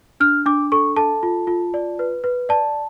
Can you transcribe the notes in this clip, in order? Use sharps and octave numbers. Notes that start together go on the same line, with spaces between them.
D4 F6
D4 D6
A4 C#6
A4 A5
F4
F4
D5
B4
B4
D5 A5